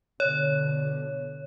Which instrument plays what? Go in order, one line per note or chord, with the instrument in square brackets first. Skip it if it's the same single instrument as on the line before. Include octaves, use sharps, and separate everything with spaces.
[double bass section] B2 D3 [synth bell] C#5